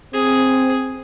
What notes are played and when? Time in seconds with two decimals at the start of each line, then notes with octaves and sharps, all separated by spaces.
0.14 C4 G#4